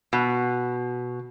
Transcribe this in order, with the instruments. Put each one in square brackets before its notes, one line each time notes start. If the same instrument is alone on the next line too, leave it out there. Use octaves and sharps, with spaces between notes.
[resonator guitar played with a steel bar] B2